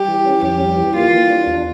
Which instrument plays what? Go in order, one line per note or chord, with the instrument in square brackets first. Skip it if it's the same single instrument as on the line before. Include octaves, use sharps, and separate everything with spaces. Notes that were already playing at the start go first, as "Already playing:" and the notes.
Already playing: [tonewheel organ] G3 [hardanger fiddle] G4
[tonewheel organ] E3
C#4
[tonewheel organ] F2 [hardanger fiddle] G4
[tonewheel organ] G3
E3
[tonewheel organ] A#3 [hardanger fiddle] F4
[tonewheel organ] E3
D4
E2